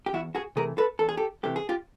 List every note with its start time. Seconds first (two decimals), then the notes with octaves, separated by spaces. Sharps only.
0.06 G4
0.13 E2 E4 F#4
0.35 F#4 G#4
0.56 C3 E3 A3 G#4 A#4
0.78 A4 B4
0.99 E2 A4
1.09 G#4
1.17 G4 A4
1.43 C3 E3 A3 G4
1.56 G#4
1.69 F4 G4